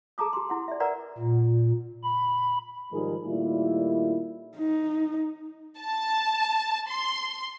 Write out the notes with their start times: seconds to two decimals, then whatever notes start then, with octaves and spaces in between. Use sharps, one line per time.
0.18 G#4 A5 A#5 D6 D#6
0.33 G4 C6
0.49 E4 F#5 C6
0.68 D5 E5
0.80 A#4 B4 D5 F#5 A#5
1.18 A#2
2.03 B5
2.91 G#2 D#3 F3 G3 G#4 A#4
3.26 A#2 D#3 G3 A3 E4
4.57 D#4
5.78 A5
6.89 C6